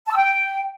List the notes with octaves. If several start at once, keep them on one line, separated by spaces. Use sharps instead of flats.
A5
E6
G5